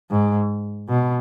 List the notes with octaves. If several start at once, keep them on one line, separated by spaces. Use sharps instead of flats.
G#2
B2